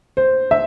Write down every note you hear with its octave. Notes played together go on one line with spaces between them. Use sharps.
C5
E5